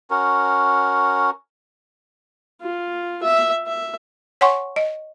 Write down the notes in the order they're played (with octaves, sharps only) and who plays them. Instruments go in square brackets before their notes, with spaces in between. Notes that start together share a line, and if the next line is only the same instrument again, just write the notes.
[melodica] C#4 F#4 A#4
[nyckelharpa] F4
E5
E5
[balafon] C#5 F#5 G#5 C6 C#6
D#5